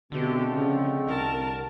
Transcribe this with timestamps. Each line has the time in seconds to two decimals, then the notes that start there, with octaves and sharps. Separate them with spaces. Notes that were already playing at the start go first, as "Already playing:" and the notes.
0.12 B2 D3 G#3 A3 C4 G4 A4
0.52 C#3 F3
1.07 C2 A#4 A5